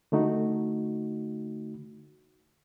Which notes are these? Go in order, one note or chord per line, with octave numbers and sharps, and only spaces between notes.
D3 A3 D#4 F#4